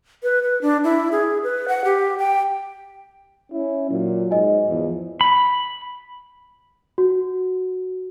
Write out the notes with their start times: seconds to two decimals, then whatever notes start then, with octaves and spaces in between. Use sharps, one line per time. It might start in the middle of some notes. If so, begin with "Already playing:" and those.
0.23 B4
0.43 B4
0.62 D4
0.84 E4
1.12 G#4
1.43 B4
1.68 F#5
1.85 G4
2.18 G5
3.52 C#4 E4
3.90 A#2 F#3
4.31 G#2 D#5 G#5
4.69 E2 F3
5.21 B5
6.98 F#4